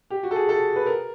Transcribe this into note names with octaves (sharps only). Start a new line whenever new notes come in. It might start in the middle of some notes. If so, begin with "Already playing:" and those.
G4
F#4
A4
G#4
A4
B4
A#4